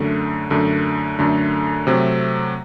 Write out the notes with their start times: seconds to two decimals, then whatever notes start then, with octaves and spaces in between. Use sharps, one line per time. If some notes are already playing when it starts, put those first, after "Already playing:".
Already playing: F#2 D3 A3
0.50 F#2 D3 A3
1.19 F#2 D3 A3
1.87 C3 F#3 A3 C4